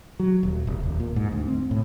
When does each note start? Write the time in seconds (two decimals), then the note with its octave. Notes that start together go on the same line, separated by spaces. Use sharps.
0.20 F#3
0.43 D#1
0.67 F1
0.83 D#1
1.00 A#2
1.16 G#2
1.32 D2
1.48 C4
1.71 A2